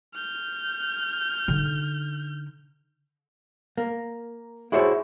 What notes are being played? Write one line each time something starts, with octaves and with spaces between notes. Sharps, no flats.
F6 G6
D3 D#4
A#3
E4 F#4 G#4 C5 C#5 E5